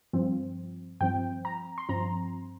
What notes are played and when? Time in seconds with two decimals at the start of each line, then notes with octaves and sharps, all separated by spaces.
0.13 G2 F3 C4
1.01 G2 F3 C4 G5
1.45 A#5
1.78 C6
1.89 G2 F3 C4 A#5